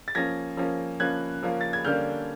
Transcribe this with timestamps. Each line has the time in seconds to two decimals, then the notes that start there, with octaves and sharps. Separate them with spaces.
0.08 A6
0.15 F3 A#3 C#4 G#6 A#6
0.57 F3 A#3 C#4
1.00 F3 A#3 C#4 F#6 G#6
1.43 F3 A#3 C#4
1.61 A6
1.73 G#6
1.84 D3 G3 A#3 C#4 F6 G6